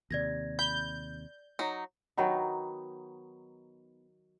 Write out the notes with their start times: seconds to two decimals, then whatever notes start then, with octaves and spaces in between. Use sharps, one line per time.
0.11 D#2 C3 D5 G#6 A#6
0.59 B5 G6
1.59 F#3 D#4
2.18 D#3 F#3 B3 D#4